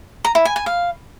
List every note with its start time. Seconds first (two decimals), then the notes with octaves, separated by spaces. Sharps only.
0.25 A#5
0.35 E4
0.45 G#5
0.56 G#5
0.66 F5